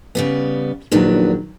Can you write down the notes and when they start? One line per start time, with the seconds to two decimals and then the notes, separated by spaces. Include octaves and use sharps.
0.15 C#3 G3 B3
0.92 A#1 A#2 D#3 F#3 B3 D4